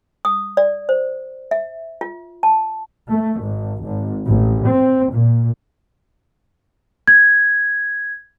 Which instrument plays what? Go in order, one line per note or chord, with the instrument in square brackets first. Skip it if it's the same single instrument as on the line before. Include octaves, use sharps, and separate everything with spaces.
[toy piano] D#6
D5
C5
E5
F4
A5
[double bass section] A3
G#1
G#1
A1
C4
A#2
[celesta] G#6